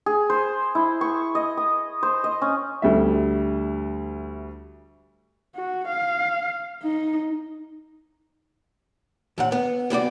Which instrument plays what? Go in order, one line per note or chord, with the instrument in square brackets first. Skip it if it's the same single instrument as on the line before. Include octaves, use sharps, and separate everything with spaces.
[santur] G#4
C5
E4
C#6
D#5
D#6
C5
D#5
C#4
[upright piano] D2 G3 E5
[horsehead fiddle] F#4
F5
D#4
[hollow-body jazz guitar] D#2 A#2 F#5
B3
C2 B3 F#4 D5